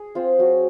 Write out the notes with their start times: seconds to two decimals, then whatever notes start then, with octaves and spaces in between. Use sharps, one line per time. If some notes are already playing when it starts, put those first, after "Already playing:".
Already playing: G#4
0.15 C4 F4
0.38 F#3 F#4